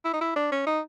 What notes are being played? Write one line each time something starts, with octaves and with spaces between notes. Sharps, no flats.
E4
D#4
E4
D4
C#4
D#4